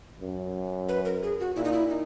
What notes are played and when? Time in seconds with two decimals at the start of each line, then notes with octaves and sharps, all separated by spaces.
0.21 F#2
0.89 B4
1.05 A#4
1.22 G#4
1.39 F#4
1.56 A#2 E4
1.64 D#4
1.72 E4
1.90 D#4